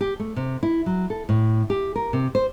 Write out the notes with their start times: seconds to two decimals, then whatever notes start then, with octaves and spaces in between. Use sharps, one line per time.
0.01 G4
0.20 A3
0.36 C3
0.63 E4
0.86 F#3
1.10 A4
1.29 A2
1.70 G4
1.96 A#4
2.13 C3
2.35 C5